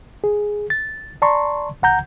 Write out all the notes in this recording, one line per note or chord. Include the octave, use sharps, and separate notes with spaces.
G#4
A6
D5 A5 A#5 C6 C#6
D2 F#5 A#5 G6